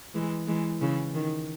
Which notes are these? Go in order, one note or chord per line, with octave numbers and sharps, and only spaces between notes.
E3 G#3
E3 G#3
C#3 E3
D#3